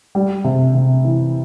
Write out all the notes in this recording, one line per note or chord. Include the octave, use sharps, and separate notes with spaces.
G3
C3
C3
E3